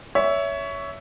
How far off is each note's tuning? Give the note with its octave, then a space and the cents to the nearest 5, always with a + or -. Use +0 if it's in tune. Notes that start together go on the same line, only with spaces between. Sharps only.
C#5 +20 E5 +0